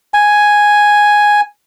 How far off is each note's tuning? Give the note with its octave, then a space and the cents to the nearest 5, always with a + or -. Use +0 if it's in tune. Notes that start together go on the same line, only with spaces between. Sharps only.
G#5 +0